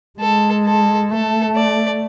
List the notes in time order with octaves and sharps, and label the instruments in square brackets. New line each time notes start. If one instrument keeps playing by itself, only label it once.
[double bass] G#3 [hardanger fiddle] A4
[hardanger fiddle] A4
[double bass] A3 [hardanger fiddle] A4
[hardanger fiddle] D5